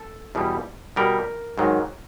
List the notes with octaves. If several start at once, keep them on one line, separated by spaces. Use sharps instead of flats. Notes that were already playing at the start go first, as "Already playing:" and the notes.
Already playing: A4
E2 B2 G3
B2 G3 A#4
G#2 D#3 F#3